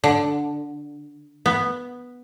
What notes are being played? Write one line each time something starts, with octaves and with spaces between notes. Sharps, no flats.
D3
B3